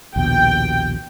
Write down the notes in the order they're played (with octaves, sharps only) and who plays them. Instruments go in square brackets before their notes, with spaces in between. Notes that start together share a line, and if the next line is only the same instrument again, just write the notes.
[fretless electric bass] A#1 D#2 B2 [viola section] G5